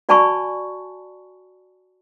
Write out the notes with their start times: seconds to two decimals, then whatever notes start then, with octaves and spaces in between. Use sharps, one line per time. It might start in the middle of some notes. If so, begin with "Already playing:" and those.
0.09 F#4 D5 G#5 A5 B5 C#6